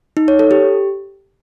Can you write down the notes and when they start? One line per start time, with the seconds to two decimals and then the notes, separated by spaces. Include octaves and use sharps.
0.17 D#4
0.28 C#5
0.39 A4
0.51 G4